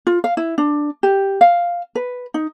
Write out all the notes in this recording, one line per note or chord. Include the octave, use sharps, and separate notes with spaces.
F4
F5
E4
D4
G4
F5
B4
D#4